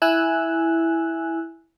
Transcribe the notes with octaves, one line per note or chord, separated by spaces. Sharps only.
E4 G#5 E6 F#6